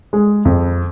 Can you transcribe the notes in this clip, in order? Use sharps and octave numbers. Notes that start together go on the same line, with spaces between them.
G#3
F2